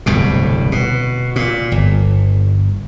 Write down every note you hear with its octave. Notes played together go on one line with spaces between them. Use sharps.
D1 C2 G2 B2
B2
A#2
G1